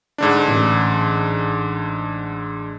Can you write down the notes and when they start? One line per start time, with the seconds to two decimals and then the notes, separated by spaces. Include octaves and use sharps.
0.18 G#2 D3 D4
0.48 A1